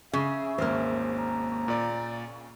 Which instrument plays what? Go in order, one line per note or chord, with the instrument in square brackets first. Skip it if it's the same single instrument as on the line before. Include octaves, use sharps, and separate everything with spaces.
[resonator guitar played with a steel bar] C#3 [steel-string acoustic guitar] G#4 [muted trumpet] E5
[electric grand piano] G#1 D#2 F6 [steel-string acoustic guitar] A#3 C5
[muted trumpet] A#5
[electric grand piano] A#2 D5